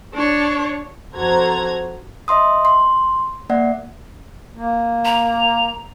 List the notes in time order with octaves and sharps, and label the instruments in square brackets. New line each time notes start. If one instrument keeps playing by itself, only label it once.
[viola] D4 C#5
[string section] F2 F#4 A4 C5 A#5 G#6
[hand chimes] D#5 E5 C6 D#6
C6
A#3 D5 E5 F#5
[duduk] A#3
[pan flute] A#5